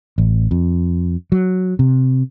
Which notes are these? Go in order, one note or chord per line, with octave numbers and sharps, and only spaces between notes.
A1
F2
F#3
C3